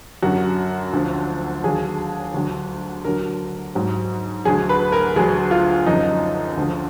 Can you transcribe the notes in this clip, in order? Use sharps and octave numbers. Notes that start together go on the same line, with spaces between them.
F#2 D3 F#3 F#4
D2 D3 F3
D#2 D3 F#3 G#4
D2 D3 F#3
D2 D3 F#3 A#4
G#2 F#3
D2 D3 F#3 G#4
B4
A#4
D2 D3 F#3 G#4
F4
F#2 D3 F3 D#4
D2 D3 F3